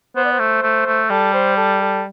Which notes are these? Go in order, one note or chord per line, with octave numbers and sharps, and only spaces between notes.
B3 C5
D5
C5
A3
A3
A3
G3 A4
C5
A4
A4